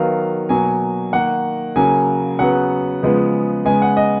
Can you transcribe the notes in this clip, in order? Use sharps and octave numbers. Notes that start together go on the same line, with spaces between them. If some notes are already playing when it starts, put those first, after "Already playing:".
Already playing: D#3 F#3 B3 F5
B2 F#3 A#3 G#5
D#3 A#3 F#5
C#3 F#3 A#3 G#5
C#3 F#3 B3 F#5
C#3 F3 G#3 B3
C#3 G#3 B3 G#5
F#5
D#5